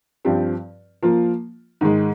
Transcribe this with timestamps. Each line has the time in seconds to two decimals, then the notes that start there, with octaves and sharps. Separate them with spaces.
0.25 G2 F3 C4 G4
1.03 F3 A#3 F4
1.81 G#2 D#3 G#3